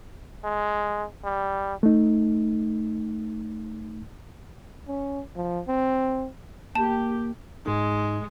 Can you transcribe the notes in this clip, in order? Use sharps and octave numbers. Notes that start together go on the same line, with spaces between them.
G#3
G3
A3 D#4
C#4
F3
C4
A#3 G4 A5
G#2 G#3 D#4